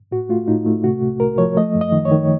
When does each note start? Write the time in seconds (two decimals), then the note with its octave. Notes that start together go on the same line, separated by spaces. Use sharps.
0.11 A2 F#4
0.29 A3 F4
0.47 A2 D#4
0.66 A3
0.84 C3 F#4
1.02 C2
1.20 C2 A#4
1.38 F3 C#5
1.57 A3 D#5
1.75 F#2
1.81 D#5
1.92 D#3
2.05 C#5
2.12 D#3